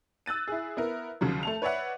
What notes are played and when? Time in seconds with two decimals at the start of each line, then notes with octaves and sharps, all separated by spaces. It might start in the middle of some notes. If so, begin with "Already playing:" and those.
0.26 E6 F#6 A6 D#7
0.48 E4 G#4
0.77 B3 E4 A#4
1.21 D#2 C#3 F3 F#3
1.43 A3 A5 F7
1.62 B4 C#5 D5 E5 F#5